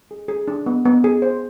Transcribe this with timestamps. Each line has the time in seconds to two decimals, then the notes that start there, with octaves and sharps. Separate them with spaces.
0.11 G#4
0.28 G#4
0.48 D4
0.66 B3
0.85 B3
1.04 G#4
1.22 C5